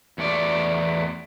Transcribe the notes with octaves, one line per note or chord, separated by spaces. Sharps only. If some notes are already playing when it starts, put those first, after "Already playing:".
E2 A3 D5